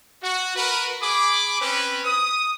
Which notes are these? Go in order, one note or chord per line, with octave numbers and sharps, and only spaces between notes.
F#4
F#4 A#4 B4
G#4 B5 D6
C4 C#4 B4
D#6